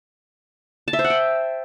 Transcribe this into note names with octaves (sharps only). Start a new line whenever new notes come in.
A5
E5
C5
F#5
G5